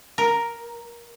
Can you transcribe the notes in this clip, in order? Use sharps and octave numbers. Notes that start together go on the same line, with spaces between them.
A#4